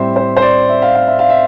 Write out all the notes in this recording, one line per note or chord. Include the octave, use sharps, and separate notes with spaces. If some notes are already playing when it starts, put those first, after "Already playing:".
Already playing: A2 G3 C4 C5 E5
C5
C5
D5
E5
F5
F5
E5
F5
E5